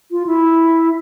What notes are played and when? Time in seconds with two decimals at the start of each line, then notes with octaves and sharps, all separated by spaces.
0.12 F4
0.27 E4